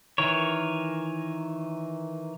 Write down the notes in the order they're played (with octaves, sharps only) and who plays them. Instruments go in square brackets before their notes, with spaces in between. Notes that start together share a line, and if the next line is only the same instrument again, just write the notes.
[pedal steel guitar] D#3 E3 A#4 C#5